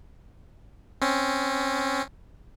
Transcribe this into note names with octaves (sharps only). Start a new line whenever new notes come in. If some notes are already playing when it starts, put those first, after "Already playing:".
C4 C#4